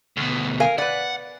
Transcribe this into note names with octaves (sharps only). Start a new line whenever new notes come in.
D2 B2
A#4 F5 G#5
B4 D5 F#5